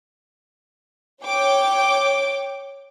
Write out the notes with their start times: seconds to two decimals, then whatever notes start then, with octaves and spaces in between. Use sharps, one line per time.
1.23 C#5 G5 D6